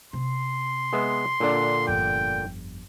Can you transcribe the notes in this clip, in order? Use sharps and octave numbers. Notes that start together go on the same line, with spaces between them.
C3 C6
G#3 B3 E5
A#2 D3 D4
G1 F2 G5